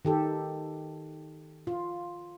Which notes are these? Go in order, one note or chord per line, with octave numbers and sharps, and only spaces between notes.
D#3 G4 A4
F4